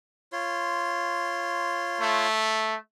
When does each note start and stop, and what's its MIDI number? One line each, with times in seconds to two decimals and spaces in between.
0.32 2.27 65
0.32 2.27 73
0.32 2.27 84
2.01 2.76 57